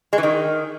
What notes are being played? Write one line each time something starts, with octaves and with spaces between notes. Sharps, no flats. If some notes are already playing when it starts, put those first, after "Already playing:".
G#3
E3
D#3